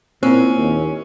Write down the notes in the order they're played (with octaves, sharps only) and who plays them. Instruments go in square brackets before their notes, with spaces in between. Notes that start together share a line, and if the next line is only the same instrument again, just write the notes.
[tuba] A#2 [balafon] A#3 E4 [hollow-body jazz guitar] C4 [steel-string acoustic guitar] C#4
[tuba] D#2